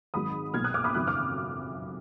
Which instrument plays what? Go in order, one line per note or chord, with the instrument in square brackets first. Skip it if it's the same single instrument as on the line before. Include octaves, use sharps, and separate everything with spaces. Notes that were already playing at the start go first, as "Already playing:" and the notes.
[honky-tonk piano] G#1 G#2 D#3 F#3 B5 D#6
B1 A#2 F#3 F6 G#6
D#6 F#6
D6 F6
B5 D#6
F#1 F2 D#3 F#3 D#6 F#6
D6 F6